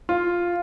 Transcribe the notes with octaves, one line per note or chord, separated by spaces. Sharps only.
F4